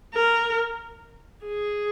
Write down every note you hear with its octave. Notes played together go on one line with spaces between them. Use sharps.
A#4
G#4